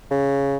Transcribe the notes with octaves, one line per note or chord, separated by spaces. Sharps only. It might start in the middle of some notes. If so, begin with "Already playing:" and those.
C#3